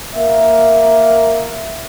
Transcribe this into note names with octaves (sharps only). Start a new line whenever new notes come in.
A#3 A#4 E5